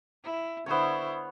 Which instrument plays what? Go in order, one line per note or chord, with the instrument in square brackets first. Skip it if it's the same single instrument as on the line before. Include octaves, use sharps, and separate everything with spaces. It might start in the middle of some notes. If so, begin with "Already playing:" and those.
[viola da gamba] E4
[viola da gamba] D3 E4 C5 [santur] B3 C#5